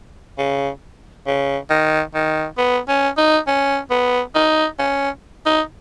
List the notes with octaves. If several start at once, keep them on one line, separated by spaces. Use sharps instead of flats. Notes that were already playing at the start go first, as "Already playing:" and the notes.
C#3
C#3
D#3
D#3
B3
C#4
D#4
C#4
B3
D#4
C#4
D#4